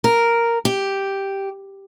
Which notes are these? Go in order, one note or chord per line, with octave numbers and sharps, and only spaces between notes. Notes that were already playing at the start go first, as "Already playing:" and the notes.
A#4
G4